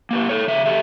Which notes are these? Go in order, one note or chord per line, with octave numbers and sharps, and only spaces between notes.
A#3 G4 B4
A4 C#5
C#3 E5
G4 A4 E5